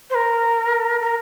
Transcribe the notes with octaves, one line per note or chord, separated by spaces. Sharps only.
C5
A#4
A#4